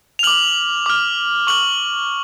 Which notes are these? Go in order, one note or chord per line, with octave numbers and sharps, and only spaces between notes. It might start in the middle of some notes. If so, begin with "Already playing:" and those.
F7
D6 F6 F#7
D6 F6
C#6 F6 F#7